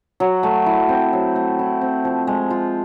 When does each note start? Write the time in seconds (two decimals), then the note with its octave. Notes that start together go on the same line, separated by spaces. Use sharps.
0.20 F#3
0.43 A3
0.66 E4
0.89 C4
1.13 F#3
1.36 A3
1.59 E4
1.81 C4
2.05 F3
2.27 G#3
2.50 F4